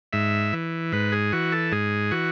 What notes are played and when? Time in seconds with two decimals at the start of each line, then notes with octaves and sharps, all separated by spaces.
0.13 G#2 E5
0.53 E3
0.92 G#2 B4
1.12 G#4
1.33 E3 F#4
1.52 A4
1.72 G#2 G#4
2.11 E3 F#4